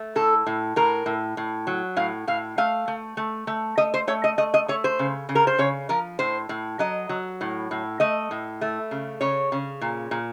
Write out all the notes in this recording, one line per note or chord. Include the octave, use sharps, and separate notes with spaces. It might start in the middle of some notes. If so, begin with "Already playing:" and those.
Already playing: A3
A2 A4
A2
A2 A#4
A2
A2
F#3
A2 F5
A2 F5
A3 F5
A3
A3
A3
A3 D#5
C5
A3 C#5
D#5
A3 D#5
D#5
A3 C#5
C5
C#3
C#3
A#4
C5
C#3 C#5
F3 A#4
A2 C5
A2
F#3 D#5
F#3
A2
A2
A3 D#5
A2
A3
C#3
C#3 C#5
C#3
A#2
A#2